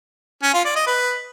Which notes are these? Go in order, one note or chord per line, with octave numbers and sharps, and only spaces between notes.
C#4
F4
D5
D#5
B4